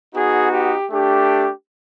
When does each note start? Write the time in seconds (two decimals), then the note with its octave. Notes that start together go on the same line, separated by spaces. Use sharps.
0.14 B3 D#4 F#4 G#4
0.52 G4
0.91 A3 D4 G4